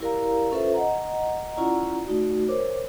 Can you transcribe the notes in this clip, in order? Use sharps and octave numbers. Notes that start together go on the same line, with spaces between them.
E4 G4 A#4 D5 F5 A#5
C#4 F4 A4 B4 C5 E5
D#5 F#5 A#5
C#4 E4 F4 D5 F#5 A#5
A3 D#4 F#4 D5
A#4 C5 C#5 D6